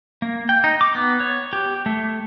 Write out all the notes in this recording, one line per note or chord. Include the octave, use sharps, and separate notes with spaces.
A#3
G5
D#4
D6
B3
C#5
G4
A3